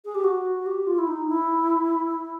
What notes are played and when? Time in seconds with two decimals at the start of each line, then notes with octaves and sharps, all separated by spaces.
0.05 G#4
0.14 G4
0.24 F#4
0.66 G4
0.87 F4
0.98 E4
1.07 D#4
1.28 E4